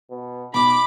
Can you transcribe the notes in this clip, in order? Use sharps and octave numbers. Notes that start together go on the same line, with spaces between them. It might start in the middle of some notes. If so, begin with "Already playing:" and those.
B2
B2 D#4 B5 D6